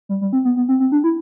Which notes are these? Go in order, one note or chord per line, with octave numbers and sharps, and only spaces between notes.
G3
G3
C4
B3
B3
C4
C4
D4
E4